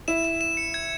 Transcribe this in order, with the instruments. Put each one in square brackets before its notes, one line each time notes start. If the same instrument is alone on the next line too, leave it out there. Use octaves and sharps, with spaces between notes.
[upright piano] E4 [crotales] E7
[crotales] E7
E7
C#7
G#6